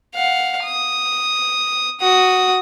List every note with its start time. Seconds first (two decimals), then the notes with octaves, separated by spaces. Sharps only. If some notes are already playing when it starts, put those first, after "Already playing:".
0.15 F5 F#5
0.63 D#6
2.00 F#4 D#6